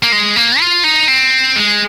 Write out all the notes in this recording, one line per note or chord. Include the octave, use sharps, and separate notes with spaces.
A#3
G#3
A#3
F4
D#4
C4
G#3